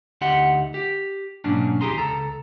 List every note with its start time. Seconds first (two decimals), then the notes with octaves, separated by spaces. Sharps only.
0.21 D2 D#4 G4 E5 F#5 C6
0.74 G4
1.44 G#2 B2 F#3 A#3 C#4 D4
1.81 D#2 E4 G4 G#4 A#5 C6
1.98 C#2 F#2 A4 A#5